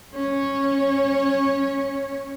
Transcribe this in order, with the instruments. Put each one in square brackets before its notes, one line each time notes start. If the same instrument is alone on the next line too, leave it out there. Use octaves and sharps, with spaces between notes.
[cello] C#4 C#5